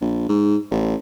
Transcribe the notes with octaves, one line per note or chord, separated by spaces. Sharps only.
A#1
G#2
A1